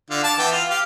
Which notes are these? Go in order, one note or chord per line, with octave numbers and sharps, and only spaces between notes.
D3 F4
A5 D6
E3 B3 G5
F4
G4 F5